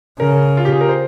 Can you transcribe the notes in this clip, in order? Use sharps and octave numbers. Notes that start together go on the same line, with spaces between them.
C#3 A#4
F4
G4
G#4
A#4
C5